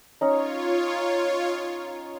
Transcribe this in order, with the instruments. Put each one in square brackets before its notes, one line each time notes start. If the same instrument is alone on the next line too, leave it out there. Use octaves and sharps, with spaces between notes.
[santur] C#4 D#4 [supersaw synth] F4 C#5